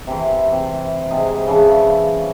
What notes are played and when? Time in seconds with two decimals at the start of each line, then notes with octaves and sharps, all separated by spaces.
0.07 C3 E3
0.52 C3
1.11 G#2 C3 G#4
1.47 C#3 E3 F5 A5